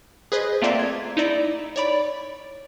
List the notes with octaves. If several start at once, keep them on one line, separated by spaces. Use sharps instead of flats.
G#4 B4 C5 D#5
A3 A#3 C4 F4 D5 E5
G#6
D#4 E4 D5 A#5
C#5 D5 B5